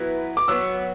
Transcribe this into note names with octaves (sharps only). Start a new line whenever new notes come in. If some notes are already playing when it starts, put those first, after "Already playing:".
Already playing: F#3 B3 E4 B4
D6
F#3 B3 F#4 E6